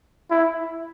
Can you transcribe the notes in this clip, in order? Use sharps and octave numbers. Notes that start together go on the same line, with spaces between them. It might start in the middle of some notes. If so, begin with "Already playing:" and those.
E4